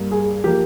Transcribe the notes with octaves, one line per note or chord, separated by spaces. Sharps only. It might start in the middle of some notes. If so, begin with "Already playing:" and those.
Already playing: G2 G3 A#3
G#4
F3 A#3 G4